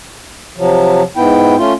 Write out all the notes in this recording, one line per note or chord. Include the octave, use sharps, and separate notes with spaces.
C3 F3 F#3
G#2 B3 E4 G5
A3 C#4 F4